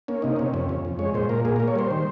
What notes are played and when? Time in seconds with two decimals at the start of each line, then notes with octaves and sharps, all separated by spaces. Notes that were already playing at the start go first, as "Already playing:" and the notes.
0.08 A#3 C#4
0.22 C3 D#4
0.36 C3 C#4
0.54 F2 C#4
0.69 F2 C#4
0.85 F2
0.99 G#3 C#5
1.14 A#2 C5
1.29 A#2 A#4
1.45 A#3 G#4
1.56 A#4
1.60 A#3
1.68 C#5
1.76 G3 C5
1.91 D#3